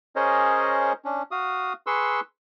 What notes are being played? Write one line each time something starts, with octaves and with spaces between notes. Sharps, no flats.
C#4 G#4 A#4 C5 C#5 D#5
C#4 D4
F#4 F5 D#6
G#4 B4 C6 C#6 E6